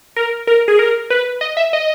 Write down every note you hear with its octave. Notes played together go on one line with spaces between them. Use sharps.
A#4
A#4
G#4
A#4
B4
D#5
E5
D#5